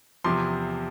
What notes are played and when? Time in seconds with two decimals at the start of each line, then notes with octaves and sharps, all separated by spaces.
0.24 E2 C3 F3 C6 D6